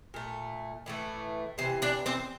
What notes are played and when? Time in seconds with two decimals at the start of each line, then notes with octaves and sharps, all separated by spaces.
0.14 A#2 A3
0.86 A2 E3 A3
1.58 C3 E3 C5
1.82 D4 D5
2.06 C4 C5